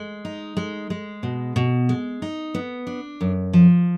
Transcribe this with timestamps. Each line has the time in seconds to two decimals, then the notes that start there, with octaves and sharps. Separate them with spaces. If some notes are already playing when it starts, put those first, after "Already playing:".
Already playing: G#3
0.25 D#4
0.57 G#3
0.90 G#3
1.23 B2
1.56 B2
1.89 G#3
2.22 D#4
2.54 B3
2.87 D4
3.21 F#2
3.53 F3